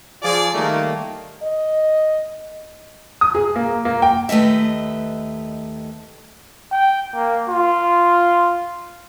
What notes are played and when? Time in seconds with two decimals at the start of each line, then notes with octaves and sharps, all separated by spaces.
0.23 F3 F4 G#4 D5
0.53 D#3 G3 A3 A#3
1.43 D#5
3.21 D#6
3.35 G#4
3.56 A#3
3.85 A#3
4.02 G5
4.29 D#2 A3 B4 D#5 E5
6.72 G5
7.15 A#3
7.49 F4